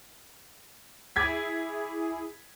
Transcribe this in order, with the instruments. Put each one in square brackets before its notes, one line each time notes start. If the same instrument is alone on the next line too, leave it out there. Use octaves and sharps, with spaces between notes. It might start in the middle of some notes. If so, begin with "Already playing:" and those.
[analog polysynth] E4 G#4 [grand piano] D6 G#6 B6